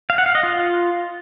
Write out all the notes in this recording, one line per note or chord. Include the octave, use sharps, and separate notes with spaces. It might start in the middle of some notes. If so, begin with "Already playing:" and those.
F5
F#5
F5
D#5
F4